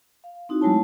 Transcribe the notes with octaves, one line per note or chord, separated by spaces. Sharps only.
F5
C4 D#4 E4 F#4
F#3 G#3 A3 E4 C#5 A5